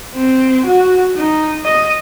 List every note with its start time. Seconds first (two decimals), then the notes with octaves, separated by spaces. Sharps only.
0.14 C4
0.66 F#4
1.17 D#4
1.64 D#5